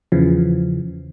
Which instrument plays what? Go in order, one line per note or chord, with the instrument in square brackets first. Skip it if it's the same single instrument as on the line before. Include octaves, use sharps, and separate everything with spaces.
[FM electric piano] E2 C#3 E3 F3